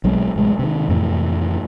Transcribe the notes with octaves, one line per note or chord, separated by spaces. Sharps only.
B1 F#3 G#3 C4
A1 C3 G#3
C3 D#3
F2 A2 C3 E3